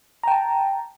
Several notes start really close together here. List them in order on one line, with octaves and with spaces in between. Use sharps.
A#5 G5 A5